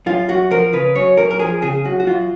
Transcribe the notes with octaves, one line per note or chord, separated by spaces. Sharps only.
F#2 F4
F#2 F#4
F3 A#4
C#3 B4
F#2 C#5
F#2 A#4
A#4
F3 G#4
C#3 G#4
F#2 F#4
F#4
F#2 F4